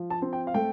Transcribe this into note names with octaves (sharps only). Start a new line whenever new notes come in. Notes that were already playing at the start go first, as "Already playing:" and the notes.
Already playing: F3
A5
C4
G5
F5
A3 G5